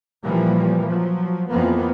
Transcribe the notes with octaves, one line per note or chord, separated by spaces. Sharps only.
A#2 E3 F3 G3 A#3
F3 F#3
F2 E3 F3 A#3 B3